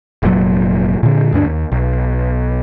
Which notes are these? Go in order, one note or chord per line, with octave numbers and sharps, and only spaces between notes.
F1 A#2 F#3
A#2 D3
D2 G2 C#4 D4
D#2
B1